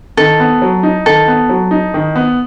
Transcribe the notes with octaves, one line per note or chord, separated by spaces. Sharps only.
D#3 A4
B3
F#3
D#4
D#3 A4
B3
F#3
D#4
D#3
B3